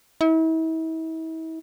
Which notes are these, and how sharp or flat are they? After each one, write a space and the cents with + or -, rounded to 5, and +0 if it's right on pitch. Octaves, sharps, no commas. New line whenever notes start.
E4 -40